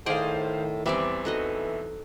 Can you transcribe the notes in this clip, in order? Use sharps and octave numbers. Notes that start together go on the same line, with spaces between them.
A2 D#3 G#4 C5 D5 D#5 F5
E2 E3 G3 C4 D5 E5
D#4 F#4 A4 D#5